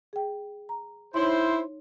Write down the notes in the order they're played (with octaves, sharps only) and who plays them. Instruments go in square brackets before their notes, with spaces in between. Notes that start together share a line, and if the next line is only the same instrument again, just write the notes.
[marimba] G#4 G5
A#5
[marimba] D#4 C#5 C6 [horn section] E4 C5